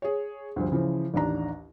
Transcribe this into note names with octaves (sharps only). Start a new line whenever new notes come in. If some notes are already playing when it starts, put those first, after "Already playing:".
G#4 C#5
D2 G2 F3
C#3 E3 F3
A1 D#2 D4 A#5